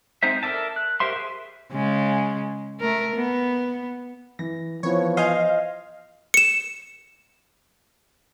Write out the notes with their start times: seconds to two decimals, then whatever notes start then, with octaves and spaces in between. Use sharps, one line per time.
0.23 G#3 C4 D#4 C5 E5
0.43 A4 A#4 D5 E5 A5
0.76 F#6
1.00 G4 A#4 C5 E5 C6
1.13 G#4 E5
1.71 C#3 G#3
2.81 A3 A#4
3.15 B3
4.39 E3 A#6
4.83 E3 F3 B3 C#5
5.17 C5 D#5 F5 G#5
6.34 C#7 E7